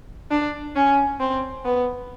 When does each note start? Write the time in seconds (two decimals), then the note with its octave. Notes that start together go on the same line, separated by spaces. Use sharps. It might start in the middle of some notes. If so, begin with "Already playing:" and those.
0.31 D4
0.76 C#4
1.20 C4
1.65 B3